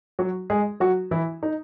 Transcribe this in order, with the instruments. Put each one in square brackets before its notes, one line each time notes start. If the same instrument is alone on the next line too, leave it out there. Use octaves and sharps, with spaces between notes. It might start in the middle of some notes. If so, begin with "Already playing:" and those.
[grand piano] F#3 F#4
G#3 G#4
F#3 F#4
E3 E4
D#4